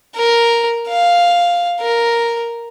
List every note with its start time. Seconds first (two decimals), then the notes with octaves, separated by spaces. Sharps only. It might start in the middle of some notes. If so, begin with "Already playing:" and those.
0.15 A#4
0.88 F5
1.80 A#4